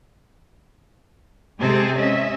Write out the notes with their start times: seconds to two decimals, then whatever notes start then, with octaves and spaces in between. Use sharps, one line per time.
1.60 C3 G#3 C4 G#4 A4
1.97 C#4 D#5 E5